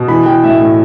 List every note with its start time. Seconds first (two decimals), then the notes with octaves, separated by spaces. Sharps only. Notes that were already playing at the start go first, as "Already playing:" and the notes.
Already playing: B2
0.08 E3 B5
0.26 E3 G5
0.44 A2 E5
0.61 A2